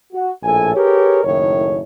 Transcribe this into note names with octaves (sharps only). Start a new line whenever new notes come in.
F#4
A#1 A2 A4 G#5
G4 G#4 A#4 B4 C#5
F#1 A2 D#3 E4 C#5